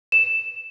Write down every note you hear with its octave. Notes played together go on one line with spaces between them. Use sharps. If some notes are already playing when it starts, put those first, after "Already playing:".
E7